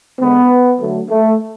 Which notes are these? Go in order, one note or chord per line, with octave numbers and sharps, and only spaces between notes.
D3 G#3 B3
D3 F#3 A3
A3